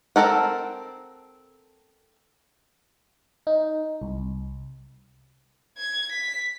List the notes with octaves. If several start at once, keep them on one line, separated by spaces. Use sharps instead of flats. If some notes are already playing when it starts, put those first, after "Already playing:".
C4 A4 A#4 F#5
D#4
C2
G#6
B6